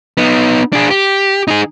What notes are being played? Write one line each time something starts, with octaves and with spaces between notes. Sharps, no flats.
B3 D#4
D4 G#4
G4
D#4 G#4